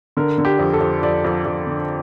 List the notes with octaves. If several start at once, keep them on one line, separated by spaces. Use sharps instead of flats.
D3 A#4
D3
G4
F2
A4
F2
F2 D5
F2
F2
D3